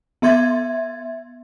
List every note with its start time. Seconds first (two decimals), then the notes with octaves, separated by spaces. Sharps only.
0.22 B3 E5 C6 G#6 A6